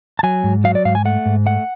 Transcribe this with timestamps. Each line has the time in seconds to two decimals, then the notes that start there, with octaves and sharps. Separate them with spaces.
0.19 A5
0.23 F#3 G#5
0.44 G#2
0.64 F#3 F5
0.75 D5
0.85 G#2 F5
0.95 G#5
1.05 A3 F#5
1.26 G#2
1.46 A3 F#5